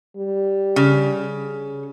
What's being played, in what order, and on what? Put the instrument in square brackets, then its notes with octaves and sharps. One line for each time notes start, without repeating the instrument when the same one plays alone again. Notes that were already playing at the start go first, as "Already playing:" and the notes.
[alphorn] G3
[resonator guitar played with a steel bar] C#3